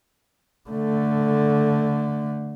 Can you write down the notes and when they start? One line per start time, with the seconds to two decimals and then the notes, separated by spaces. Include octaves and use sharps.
0.69 D3 A3